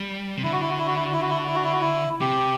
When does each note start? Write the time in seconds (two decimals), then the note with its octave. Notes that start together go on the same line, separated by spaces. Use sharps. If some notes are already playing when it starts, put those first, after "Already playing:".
Already playing: G3
0.37 C3
0.44 D3 E4
0.53 F#4
0.61 E4
0.70 F#4
0.78 E4
0.87 F#4
0.95 E4
1.05 F#4
1.12 E4
1.22 F#4
1.29 E4
1.38 F#4
1.47 E4
1.55 F#4
1.64 E4
1.73 F#4
1.81 E4
2.21 C3 G4